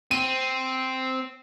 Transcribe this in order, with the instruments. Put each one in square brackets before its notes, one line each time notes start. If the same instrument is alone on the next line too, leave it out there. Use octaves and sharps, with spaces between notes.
[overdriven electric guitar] C4 [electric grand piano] D#7